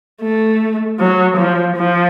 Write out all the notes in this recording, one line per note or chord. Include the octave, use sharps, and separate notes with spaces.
A3
F#3
F3
F3